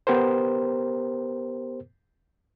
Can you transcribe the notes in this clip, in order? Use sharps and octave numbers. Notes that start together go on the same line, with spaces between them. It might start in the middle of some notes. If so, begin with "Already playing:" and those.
B3 G4 A#4 C5